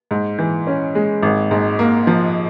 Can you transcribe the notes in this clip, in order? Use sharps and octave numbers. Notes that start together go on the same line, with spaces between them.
G#2
E3
C#4
G#3
G#1
G#2
A#3
F3